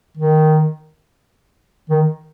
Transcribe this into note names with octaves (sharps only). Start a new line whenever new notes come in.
D#3
D#3